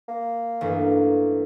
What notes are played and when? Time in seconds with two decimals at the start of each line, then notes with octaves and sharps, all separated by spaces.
0.08 A#3
0.61 A1 G2